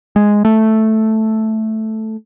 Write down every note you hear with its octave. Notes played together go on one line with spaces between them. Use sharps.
G#3
A3